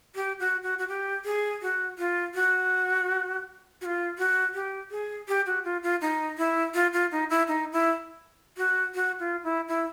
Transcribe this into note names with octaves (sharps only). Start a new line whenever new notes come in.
G4
F#4
F#4
F#4
G4
G#4
F#4
F4
F#4
F#4
F4
F#4
G4
G#4
G4
F#4
F4
F4
D#4
E4
F4
F4
D#4
E4
D#4
E4
F#4
F#4
F4
E4
E4